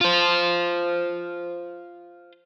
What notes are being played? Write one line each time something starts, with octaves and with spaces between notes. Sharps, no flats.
F4 C5